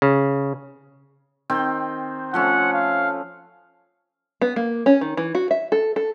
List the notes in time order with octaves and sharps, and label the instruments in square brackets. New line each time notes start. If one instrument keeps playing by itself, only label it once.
[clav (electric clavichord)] C#3
[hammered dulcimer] D#3 C4 G5
[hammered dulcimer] F3 A3 C#4 [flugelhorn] F#5
[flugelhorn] F5
[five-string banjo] B3
A#3
C#4
D#3
E3
F#4
E5
A4
A4